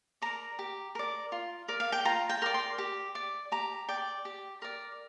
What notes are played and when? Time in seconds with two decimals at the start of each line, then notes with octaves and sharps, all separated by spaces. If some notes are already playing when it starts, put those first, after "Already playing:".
0.22 A#4 D5 A#5
0.59 G4
0.95 A#4 D5
1.32 F4
1.68 A#4 D5
1.80 F5
1.92 G5
2.05 F4 A#5
2.29 G5
2.42 A#4 D5
2.54 C6
2.78 G4
3.15 D5
3.52 G4 A#5
3.89 D5 G5
4.25 G4
4.62 A#4 D5